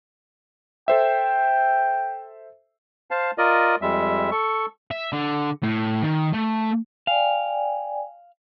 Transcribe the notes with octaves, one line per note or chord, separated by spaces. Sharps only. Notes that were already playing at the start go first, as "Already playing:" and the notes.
A4 C5 E5 G5
C5 F5 A5
F4 A#4 D5 D#5
F2 G3 G#3 E5
A4 C#6
E5
D3
A2
D#3
A3
D5 F5 G5 G#5